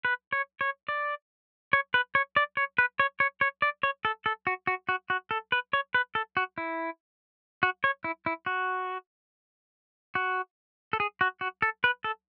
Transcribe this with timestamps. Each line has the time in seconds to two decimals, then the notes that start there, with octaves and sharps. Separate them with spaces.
0.05 B4
0.33 C#5
0.61 C#5
0.89 D5
1.73 C#5
1.94 B4
2.15 C#5
2.36 D5
2.57 C#5
2.78 B4
3.00 C#5
3.20 C#5
3.41 C#5
3.62 D5
3.83 C#5
4.05 A4
4.26 A4
4.47 F#4
4.67 F#4
4.89 F#4
5.10 F#4
5.31 A4
5.52 B4
5.73 C#5
5.94 B4
6.15 A4
6.37 F#4
6.58 E4
7.63 F#4
7.84 C#5
8.04 E4
8.26 E4
8.46 F#4
10.15 F#4
10.93 A4
11.00 G#4
11.21 F#4
11.41 F#4
11.62 A4
11.84 B4
12.04 A4